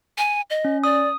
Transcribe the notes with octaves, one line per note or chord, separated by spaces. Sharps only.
G#5
D#5
C#4
D5 D#6